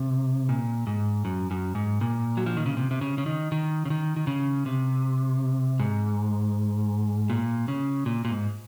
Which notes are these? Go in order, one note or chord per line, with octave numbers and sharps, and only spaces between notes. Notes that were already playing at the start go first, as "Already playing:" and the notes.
Already playing: C3
A#2
G#2
F#2
F#2
G#2
A#2
F#3
F3
D#3
C#3
C3
C3
C#3
C#3
D#3
D#3
C#3
D#3
D#3
C#3
C3
G#2
A#2
C#3
A#2
A#2
G#2